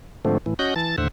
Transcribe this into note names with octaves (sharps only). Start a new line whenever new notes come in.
G#2 D3 F3 A3 C4
A2 E3
C#4 F#4 D#5 F#6 G6
E3 A5 A6
D#2 A2 D3 C5 E5 F#5